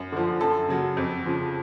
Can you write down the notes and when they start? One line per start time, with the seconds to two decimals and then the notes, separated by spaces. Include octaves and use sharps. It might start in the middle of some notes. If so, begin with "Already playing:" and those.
Already playing: F#2
0.12 D3 F3
0.41 F#2 A4
0.68 C#3 F#3
0.97 F2
1.26 C#3 F3